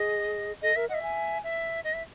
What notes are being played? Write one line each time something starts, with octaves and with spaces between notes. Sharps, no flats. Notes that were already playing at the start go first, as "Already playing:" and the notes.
Already playing: G#4 D#5
A4 D#5
A#4 E5
D#5 E5 F#5
G#5
E5
D#5
E5